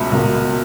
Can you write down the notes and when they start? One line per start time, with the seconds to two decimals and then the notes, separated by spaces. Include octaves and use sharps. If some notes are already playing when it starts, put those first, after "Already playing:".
Already playing: C#2 B2 E5 B5
0.12 C#2 B2 A#3